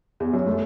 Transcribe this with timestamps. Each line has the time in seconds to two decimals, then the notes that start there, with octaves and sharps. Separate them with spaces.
0.20 E2
0.33 F#2
0.46 A3